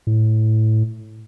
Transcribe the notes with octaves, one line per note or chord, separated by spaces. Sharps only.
A2